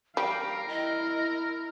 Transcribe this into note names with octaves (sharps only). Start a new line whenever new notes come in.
G3 A#4 F5 G5
E4 D#5